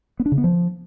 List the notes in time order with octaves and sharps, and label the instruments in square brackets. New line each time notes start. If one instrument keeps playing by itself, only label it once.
[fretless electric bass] B3
D4
C#3
B3
F3